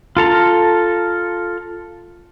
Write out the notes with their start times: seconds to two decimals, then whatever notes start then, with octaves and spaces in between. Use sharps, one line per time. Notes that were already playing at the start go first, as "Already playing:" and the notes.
0.17 F4 A4 A#5